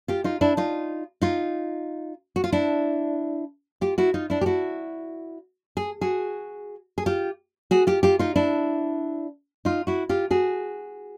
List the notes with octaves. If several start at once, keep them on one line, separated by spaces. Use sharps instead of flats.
F4 G4
D#4 F4
D4 E4
D#4 F4
D#4 F4
F#4
F4
D4 E4
F4 G4
E4 F#4
D#4 F4
D4 E4
G4
E4 F#4
G#4
F#4 G#4
G#4
F4 G4
F#4 G#4
F4 G4
F4 G4
D#4 F4
D4 E4
D#4 F4
E4 F#4
F4 G4
F#4 G#4